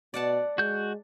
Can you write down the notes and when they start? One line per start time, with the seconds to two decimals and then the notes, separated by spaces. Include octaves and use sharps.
0.14 B2 D5 F#5 A5
0.58 G#3 F#4 G6